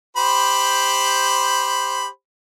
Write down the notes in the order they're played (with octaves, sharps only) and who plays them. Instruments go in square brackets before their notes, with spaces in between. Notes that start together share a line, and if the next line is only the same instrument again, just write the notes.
[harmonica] G4 C5 B5